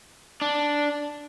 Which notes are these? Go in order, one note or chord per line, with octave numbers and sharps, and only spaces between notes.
D4